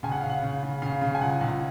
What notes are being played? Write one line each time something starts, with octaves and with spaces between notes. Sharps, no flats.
C#3 G#5
F#5
C#3 F5
F#5
C#3
C#3
C#3 F5
C#3
G#5
C#2 F#5
C#2